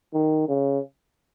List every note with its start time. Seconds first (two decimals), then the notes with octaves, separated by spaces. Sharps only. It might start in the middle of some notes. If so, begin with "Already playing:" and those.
0.14 D#3
0.49 C#3